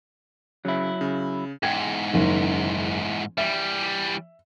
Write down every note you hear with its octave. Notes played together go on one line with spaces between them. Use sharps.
C#3 F#3 E4
C#3
E2 G#2 G5 G#6
F#1 D#3
E3 G3 E5